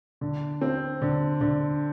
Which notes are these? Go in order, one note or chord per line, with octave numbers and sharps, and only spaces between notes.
D3
C4
D3
D3